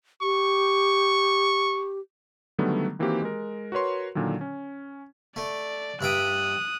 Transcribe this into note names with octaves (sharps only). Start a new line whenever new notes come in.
G4 C#6
D3 D#3 F#3 G3 A3 B3
D#3 E3 A#3 C4 F#4 G4
G#3 A#4
F#4 A#4 B4 C#5 C6
A#2 D3 D#3 F#3
C#4
A3 D5
G2 E5 G5 D#6 F#6